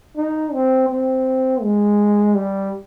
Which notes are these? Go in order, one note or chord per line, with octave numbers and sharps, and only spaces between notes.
D#4
C4
C4
G#3
G3